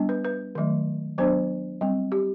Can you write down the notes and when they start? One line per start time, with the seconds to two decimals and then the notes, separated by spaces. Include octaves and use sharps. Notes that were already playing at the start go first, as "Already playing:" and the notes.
Already playing: G3 B3 D4
0.09 B4
0.25 B4
0.55 D#3 F#3 A3
1.18 F#3 B3 D4 C5
1.81 G3 C4
2.12 G4